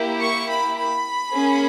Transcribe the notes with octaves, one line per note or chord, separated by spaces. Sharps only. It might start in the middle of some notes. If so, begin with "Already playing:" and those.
Already playing: A#3 E4 G4
C#6
B5
B5
A#3 C#4 G#4